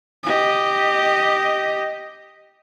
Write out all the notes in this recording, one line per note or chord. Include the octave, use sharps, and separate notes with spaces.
G4 D#5